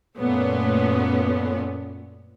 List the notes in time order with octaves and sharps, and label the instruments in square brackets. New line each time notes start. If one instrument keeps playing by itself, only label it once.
[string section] F#2 A#2 A3 B3 C#4